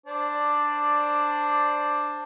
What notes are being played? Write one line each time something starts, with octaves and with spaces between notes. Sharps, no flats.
D4 C5 D5